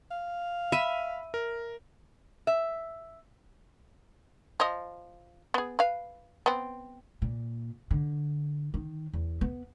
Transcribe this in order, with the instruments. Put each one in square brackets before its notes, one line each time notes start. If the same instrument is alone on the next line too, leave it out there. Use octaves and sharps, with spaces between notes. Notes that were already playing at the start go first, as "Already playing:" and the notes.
[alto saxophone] F5
[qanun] E5 [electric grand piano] B5 D#7
[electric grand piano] A#4
[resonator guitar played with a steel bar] E5
[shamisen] F3 D#5
B3 G#4
B4 F5
B3 C4
[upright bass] A#2
D3
D#3
E2
B3